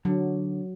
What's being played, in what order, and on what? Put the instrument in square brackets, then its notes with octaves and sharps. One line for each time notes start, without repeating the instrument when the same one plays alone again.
[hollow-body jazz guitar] D3 [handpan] F#3